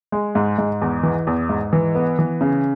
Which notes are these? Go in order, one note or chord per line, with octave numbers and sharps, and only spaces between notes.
G#3
G#2
G#2
E2
E3
E2
G#2
E3
B3
E3
C#3